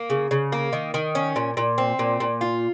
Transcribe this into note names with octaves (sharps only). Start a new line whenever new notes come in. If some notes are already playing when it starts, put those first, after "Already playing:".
Already playing: A#3
C#3
C#3
A#3
D#3
D#3
C#4
A#2
A#2
C4
A#2
A#2
F4